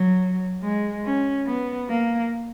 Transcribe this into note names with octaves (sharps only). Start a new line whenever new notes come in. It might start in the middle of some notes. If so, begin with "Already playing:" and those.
Already playing: F#3
G#3
C#4
B3
A#3